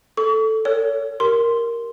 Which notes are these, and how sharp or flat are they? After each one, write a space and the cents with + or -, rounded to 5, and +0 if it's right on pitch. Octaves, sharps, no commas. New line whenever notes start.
A4 +0 C#6 +40
A4 +45 C#5 +25
G4 -15 A#4 +0 C6 +0